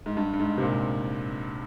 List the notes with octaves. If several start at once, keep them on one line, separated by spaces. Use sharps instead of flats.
G#2
G2
G2
G#2
C3
A#2